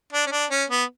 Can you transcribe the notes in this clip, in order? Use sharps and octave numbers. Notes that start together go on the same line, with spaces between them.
D4
C#4
D4
C#4
B3